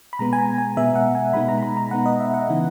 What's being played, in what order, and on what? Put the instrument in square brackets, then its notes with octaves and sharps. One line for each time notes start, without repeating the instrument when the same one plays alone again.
[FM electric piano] B5
B2 G#3 B3 A#5
G#5
A#5
G#5
B2 G#3 B3 E5
F#5
G#5
B2 G#3 B3 D#4 B5
A#5
B5
A#5
B2 G#3 B3 D#4 F#5
D#5
E5
F#5
C#3 E3 B3 D#4